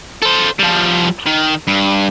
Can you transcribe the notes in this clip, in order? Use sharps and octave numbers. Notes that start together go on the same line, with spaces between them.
A4 C5
F3 G3
D#3
G2